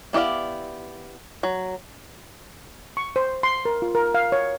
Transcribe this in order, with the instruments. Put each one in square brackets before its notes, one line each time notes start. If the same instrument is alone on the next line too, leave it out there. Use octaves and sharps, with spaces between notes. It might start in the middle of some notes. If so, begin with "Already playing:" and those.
[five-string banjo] B3 E4 G4 D5 F5
F#3
[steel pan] C#6
C5
C6
A#4
F4
A#4
F5
C#5